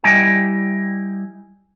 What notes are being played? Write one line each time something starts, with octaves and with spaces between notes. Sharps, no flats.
G3 E4 D#5 G5 G#5